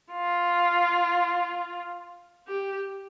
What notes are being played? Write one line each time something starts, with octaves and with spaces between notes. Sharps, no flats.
F4
G4